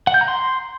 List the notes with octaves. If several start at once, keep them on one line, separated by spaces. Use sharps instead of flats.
F#5
G6
A#5
C6